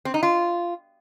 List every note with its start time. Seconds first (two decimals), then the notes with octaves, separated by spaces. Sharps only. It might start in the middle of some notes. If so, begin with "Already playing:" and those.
0.05 C4
0.14 D#4
0.23 F4